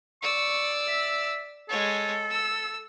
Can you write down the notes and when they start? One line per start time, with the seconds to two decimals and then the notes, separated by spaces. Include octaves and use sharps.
0.22 D5 C#6 E6
0.88 E5
1.69 G#3 A4 C#5
2.31 E6